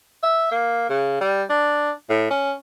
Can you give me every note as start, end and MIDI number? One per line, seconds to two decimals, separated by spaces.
0.23 0.47 76
0.51 0.89 58
0.89 1.18 49
1.21 1.43 55
1.50 1.91 62
2.10 2.27 45
2.30 2.53 61